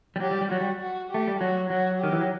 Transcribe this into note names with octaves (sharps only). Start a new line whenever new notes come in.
G3
F#3 G4
G3
G3
F#3 F#4
G3
F#4
A3 G4
G3
F#3 F#4
F#3 F#4
D#3 G4
E3
F#3